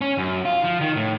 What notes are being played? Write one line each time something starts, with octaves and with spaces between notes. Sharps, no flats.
C#4
F#2
F4
F3
D#3
A2